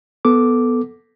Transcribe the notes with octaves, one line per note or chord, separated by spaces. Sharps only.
B3 A4 D6